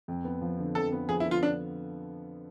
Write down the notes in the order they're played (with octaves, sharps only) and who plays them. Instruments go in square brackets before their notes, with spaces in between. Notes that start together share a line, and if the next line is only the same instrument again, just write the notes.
[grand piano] F2
B3
F3
D3
[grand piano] F2 [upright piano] A4
[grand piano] B3
[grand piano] F3 [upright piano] G#4
[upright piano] E4
[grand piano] D3
[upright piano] F4
D4